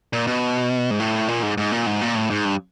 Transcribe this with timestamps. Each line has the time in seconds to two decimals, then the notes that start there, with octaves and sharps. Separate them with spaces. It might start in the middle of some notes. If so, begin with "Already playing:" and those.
0.13 A#2
0.27 B2
0.91 G#2
1.00 A2
1.28 A#2
1.43 G#2
1.57 G#2
1.72 A#2
1.86 G#2
2.01 A#2
2.15 A2
2.30 G#2
2.45 G2